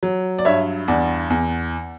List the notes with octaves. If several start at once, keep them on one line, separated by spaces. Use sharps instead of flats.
F#3
D5
G2 C#5 E5
E2 D5 F#5
E2